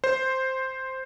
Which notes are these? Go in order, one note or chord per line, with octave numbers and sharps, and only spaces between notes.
C5